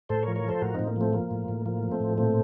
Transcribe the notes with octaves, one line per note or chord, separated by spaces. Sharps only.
A2 A4 C5
A#4 C#5
F3
A#4 C#5
F3 A4 C5
A2 F#4 A#4
A2 C4 D#4
A#3
F3 A3 C4
F3 A#3
A2
A2
F3 A#3
F3
A3 C4
A2
A#2 A3 C4